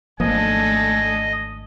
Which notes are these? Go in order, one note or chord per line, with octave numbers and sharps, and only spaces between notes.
G#1 F3 A3 A#3 D4 A4 D#5 G#5